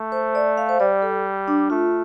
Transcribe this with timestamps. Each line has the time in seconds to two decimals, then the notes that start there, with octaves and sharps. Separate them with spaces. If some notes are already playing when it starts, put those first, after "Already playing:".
Already playing: A3
0.12 C5
0.35 D5
0.57 F5
0.69 C5
0.80 G3 D5
1.02 A4
1.48 D4
1.70 A3 F4